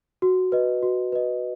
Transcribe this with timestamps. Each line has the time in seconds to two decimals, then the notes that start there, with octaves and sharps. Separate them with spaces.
0.22 F#4
0.52 B4 D#5
0.83 F#4
1.12 B4 D#5